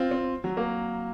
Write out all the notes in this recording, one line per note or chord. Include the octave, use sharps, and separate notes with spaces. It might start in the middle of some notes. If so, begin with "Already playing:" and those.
Already playing: C4 F4
C4
F#3
A#3